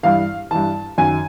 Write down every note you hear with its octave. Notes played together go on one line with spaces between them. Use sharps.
G2 E3 F5
G2 E3 A5
F#2 D#3 G#5